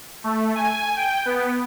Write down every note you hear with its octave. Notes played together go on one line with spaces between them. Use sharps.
A3
G#5
G5
B3